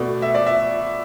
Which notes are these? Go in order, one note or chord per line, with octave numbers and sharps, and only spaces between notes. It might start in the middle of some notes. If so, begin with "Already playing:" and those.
Already playing: B2 A3 D5
E5
D5
E5